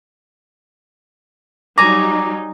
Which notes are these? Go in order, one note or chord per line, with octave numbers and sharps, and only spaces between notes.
F#3 G3 D#4 G#5 A#5 D6